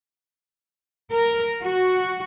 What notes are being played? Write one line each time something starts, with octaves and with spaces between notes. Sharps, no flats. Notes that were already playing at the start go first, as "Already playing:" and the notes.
A#4
F#4